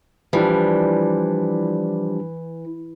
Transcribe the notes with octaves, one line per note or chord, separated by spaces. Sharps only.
E3 F3 G3 D4